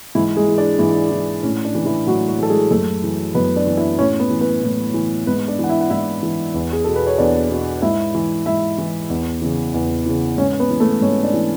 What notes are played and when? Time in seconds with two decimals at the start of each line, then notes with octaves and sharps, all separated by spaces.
0.15 G#2 E3 E4
0.36 G#3 G#4
0.48 E3
0.58 D4 D5
0.79 G#2 E3 E4
1.11 E3
1.43 A2 C#4
1.65 D4
1.75 E3
1.86 E3 E4
2.07 A2 F#3 F#4
2.28 F#3 F#4
2.39 E3 A4
2.50 G#3 G#4
2.71 F#2 A3 A4
3.04 E3
3.35 F#2 B3 B4
3.56 D4 D5
3.67 E3
3.77 E4 E5
3.99 A2 C#4 C#5
4.20 B3 B4
4.31 E3
4.41 B3 B4
4.63 A2
4.94 E3
5.27 G#2 B3 B4
5.48 D4 D5
5.59 E3 F#5
5.69 E4 E5
5.81 F#5
5.90 G#2 E4 E5
6.23 E3
6.54 E2
6.73 G#4
6.84 B2 A4
6.96 B4
7.07 C#5
7.18 E2 D4 D5
7.50 B2
7.82 G#2 E4 E5
8.15 E3
8.46 G#2 E4 E5
8.78 E3
9.10 E2
9.42 C#3 E3
9.74 E2
10.06 C#3 E3
10.38 G#2 C#4 C#5
10.60 B3 B4
10.70 E3
10.80 A3 A4
11.01 G#2 C#4 C#5
11.23 D4 D5
11.34 E3